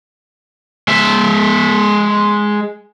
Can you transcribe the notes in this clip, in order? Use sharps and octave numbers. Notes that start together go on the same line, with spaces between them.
G#3 E5